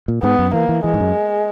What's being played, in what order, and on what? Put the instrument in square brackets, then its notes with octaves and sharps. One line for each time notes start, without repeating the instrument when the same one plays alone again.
[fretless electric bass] A#2
[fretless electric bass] G#2 [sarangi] B3
[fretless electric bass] F#2
[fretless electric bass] E3 [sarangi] A#3
[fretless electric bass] E3
[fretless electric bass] E3 [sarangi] G#3
[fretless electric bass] G#2
F#2